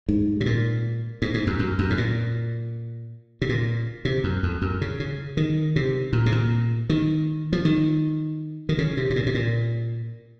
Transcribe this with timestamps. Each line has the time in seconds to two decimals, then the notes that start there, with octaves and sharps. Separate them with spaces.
0.09 G#2
0.41 C3
0.46 A#2
1.22 G#2
1.34 G#2
1.47 F#2
1.59 F#2
1.79 F#2
1.90 G#2
1.98 A#2
3.42 C3
3.49 A#2
4.05 C3
4.24 F#2
4.43 F2
4.62 F#2
4.81 C#3
5.00 C#3
5.37 D#3
5.76 C3
6.13 A#2
6.26 C3
6.32 A#2
6.90 D#3
7.53 F3
7.65 D#3
8.69 D#3
8.78 C#3
8.97 C3
9.10 C3
9.16 A#2
9.26 C3
9.35 A#2